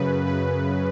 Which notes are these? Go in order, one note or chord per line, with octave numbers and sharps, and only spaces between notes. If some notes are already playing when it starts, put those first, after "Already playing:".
Already playing: F#2 C#3 B4
B4